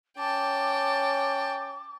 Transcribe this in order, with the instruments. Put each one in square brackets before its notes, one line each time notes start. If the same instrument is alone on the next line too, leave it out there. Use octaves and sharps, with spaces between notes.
[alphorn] C#4 [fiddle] G5 A5 [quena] D6